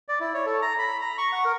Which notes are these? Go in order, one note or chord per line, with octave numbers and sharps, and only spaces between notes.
D5
E4
C#5
A4
A#5
B5
A#5
C#6
F#5
A#4